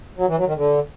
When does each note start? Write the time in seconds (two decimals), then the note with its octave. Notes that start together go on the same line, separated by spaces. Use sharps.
0.18 F#3
0.27 E3
0.37 F#3
0.47 D#3
0.56 D3